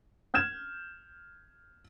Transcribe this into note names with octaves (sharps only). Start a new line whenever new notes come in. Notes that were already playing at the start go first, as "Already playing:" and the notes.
F6 G6 G#6 E7